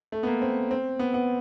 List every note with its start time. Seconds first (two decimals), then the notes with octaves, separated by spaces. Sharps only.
0.12 A3
0.23 B3
0.27 A#3
0.42 C4
0.71 C4
0.99 B3
1.14 B3